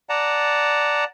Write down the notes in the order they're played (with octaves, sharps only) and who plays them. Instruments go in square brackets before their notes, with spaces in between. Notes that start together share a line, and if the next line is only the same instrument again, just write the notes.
[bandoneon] D5 F#5 A5 A#5